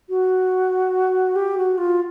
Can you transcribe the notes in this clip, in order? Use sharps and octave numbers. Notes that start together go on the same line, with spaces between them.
F#4
G4
F#4
F4